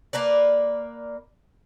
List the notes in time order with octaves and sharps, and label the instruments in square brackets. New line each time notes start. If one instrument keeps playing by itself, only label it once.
[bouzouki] A#3 A#4 B4 D5